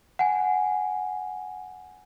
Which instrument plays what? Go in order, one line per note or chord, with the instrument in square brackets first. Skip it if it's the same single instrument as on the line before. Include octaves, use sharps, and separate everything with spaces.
[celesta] F#5 G#5